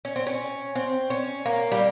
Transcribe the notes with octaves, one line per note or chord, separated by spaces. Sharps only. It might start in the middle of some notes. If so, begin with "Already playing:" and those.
C#4
C4
C#4
C4
C#4
A#3
G3